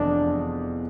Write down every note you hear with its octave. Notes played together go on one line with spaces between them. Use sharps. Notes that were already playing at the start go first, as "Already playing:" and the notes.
Already playing: F1 E2 D4